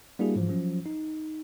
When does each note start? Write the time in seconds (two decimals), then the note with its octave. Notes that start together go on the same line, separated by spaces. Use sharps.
0.19 G3 A#3 D4 E4 F#4 G#4
0.35 G#2 E3 F3
0.49 F3 F#3 C#4
0.86 D#4